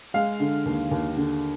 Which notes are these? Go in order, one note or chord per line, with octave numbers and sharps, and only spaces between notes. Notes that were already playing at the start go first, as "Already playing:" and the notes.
G#3 F5
D3
D#2
D#2
D3